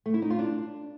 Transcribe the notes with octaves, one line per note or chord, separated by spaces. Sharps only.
A3
E4
D#4
F4
D4